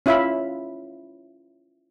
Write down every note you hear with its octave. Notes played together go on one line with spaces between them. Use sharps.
C#4 E4 F4 E5 F5 B5